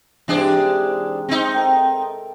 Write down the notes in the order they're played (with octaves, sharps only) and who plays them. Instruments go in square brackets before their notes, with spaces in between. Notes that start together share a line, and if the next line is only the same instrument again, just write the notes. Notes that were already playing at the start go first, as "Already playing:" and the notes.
[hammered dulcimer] G#2 C3 [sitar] E3 D4 G#4
[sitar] C4 D#4
[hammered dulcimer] A4 A#4 G5